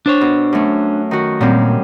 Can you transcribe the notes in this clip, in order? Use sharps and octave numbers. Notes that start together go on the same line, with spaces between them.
D4 C5 C#5
B2
F#2 A3
D#3 F#4
F#2 A#2 G3 C4